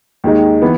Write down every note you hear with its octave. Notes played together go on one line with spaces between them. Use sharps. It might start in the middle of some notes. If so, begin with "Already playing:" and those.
D#2 D#3 G#3 D#4
E3 B3